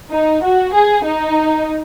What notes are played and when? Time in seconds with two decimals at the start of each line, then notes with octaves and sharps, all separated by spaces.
0.11 D#4
0.43 F#4
0.74 G#4
1.04 D#4